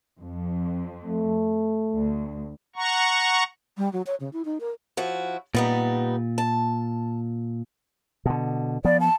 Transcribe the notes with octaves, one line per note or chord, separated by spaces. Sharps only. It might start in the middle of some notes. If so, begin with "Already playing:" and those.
F2
A3
D2
F#5 A#5 C#6
G3
F#3
C#5
C#3
E4
D#4
A#4
F3 E4 F#4
A#2 G3 B3 D#4
A5
B2 D3
F3 B3 D5
A5